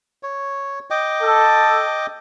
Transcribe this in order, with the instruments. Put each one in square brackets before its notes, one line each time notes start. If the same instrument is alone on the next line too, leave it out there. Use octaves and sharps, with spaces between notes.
[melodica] C#5
D#5 G5 D6
[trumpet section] A4